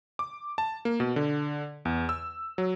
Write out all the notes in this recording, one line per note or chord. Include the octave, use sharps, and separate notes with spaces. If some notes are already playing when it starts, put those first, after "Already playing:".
D6
A5
A#3
B2
D3
E2
E6
F#3